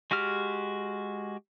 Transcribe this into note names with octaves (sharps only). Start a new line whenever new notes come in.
G#3 F#4 G4 F6